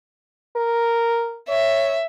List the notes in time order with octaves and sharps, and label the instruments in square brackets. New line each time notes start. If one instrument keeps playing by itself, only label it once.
[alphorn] A#4
[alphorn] C#5 [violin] E5